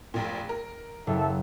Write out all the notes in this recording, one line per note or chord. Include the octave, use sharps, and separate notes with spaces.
F1 A#1 A#2
A#4
F#1 A4 E5